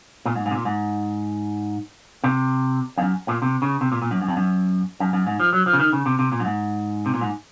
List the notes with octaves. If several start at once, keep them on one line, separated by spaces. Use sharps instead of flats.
A#2
G#2
G#2
C3
A#2
G#2
C3
F2
F#2
A#2
C3
C#3
C3
A#2
A#2
F#2
F#2
F2
F#2
F#2
F#2
G#2
F3
F#3
F3
C#3
D#3
C#3
C3
C3
A#2
F#2
G#2
C3
A#2
G#2